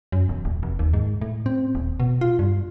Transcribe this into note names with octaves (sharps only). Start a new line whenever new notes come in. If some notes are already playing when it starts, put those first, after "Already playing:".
F#2
E1
D#1
F1
D#2
G#2
A2
C4
D#1
B2
F4
G2